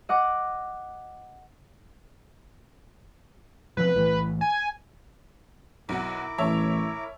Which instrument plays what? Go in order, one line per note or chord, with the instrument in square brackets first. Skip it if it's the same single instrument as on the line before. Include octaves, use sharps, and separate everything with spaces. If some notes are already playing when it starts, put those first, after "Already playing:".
[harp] D#5 F#5 D6
[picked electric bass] B2 F3 C4 [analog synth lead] B4
[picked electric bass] B1 A2 E3
[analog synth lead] G#5
[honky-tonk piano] B1 F#4 F#5 [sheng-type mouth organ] E4 A#4 D6
[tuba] A1 [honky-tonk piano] C#5 E5 A5